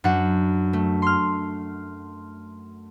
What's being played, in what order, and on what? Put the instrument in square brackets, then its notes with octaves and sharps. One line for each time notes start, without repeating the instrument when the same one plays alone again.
[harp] F#2 D4 F#5
A3
C6 F6